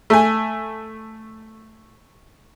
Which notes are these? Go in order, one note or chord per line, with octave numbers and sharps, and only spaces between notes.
A3 G#5